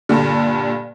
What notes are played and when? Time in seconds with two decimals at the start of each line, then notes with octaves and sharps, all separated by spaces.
0.09 G2 A#2 D3